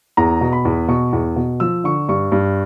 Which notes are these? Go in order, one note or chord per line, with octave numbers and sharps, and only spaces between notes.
E2 A#5
B2
B5
E2
B2 C#6
E2
B2
F3 E6
D3 C#6
G2 C#6
G2